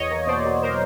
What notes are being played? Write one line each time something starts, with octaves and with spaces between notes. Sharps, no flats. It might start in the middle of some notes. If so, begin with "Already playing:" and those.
Already playing: E2 C#5 D#5
A#3
B2 C5 D5
F#3
A#4 C5